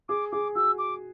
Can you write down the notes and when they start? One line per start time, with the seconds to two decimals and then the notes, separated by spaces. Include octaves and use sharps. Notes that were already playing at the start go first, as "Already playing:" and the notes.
0.09 G#4 D6
0.32 G#4 D6
0.55 F#4 E6
0.78 D6